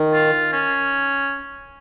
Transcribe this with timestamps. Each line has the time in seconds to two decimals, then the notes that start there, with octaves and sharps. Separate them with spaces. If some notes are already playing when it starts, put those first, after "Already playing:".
Already playing: D#3
0.13 F4
0.53 C#4